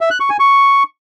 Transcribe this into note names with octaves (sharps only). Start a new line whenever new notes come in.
E5
F#6
C#6
G#5
C#6